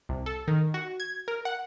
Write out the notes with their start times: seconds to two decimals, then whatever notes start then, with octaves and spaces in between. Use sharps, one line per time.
0.09 C2
0.26 A4
0.48 D#3
0.74 F#4
1.00 G#6
1.28 A#4
1.45 F#5